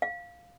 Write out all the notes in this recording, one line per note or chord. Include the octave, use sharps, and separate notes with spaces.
F5